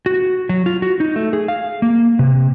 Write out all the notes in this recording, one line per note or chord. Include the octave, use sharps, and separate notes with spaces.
F#4
F#3
F4
F#4
D#4
A3
G#4
F5
A#3
C3